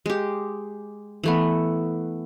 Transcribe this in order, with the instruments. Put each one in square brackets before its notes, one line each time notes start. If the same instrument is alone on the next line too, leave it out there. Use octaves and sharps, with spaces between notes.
[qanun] G#3 G4
E3 A3 B3